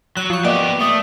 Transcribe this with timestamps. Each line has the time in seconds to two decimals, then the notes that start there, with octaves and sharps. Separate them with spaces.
0.17 F#3 F#6
0.30 F3 C#6
0.45 A#3 B3 G4 D5 D#5 F#5
0.80 A3 D#6